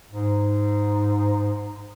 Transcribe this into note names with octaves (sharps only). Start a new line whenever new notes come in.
G#2